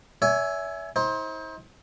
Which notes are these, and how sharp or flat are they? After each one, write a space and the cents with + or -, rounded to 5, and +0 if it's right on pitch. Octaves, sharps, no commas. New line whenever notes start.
C#5 +40 E5 +0 G#5 +5
D#4 +45 C5 +25